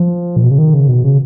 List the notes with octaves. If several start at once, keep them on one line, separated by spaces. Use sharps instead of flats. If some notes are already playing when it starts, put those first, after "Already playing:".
Already playing: F3
A#2
B2
C#3
D#3
C#3
B2
C#3